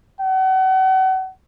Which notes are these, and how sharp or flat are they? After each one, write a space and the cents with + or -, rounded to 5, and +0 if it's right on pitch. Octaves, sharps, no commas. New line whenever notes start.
F#5 +35